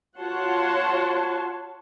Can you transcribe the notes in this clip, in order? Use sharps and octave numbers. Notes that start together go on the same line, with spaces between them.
F4 F#4 C#5 F#5 A5 C6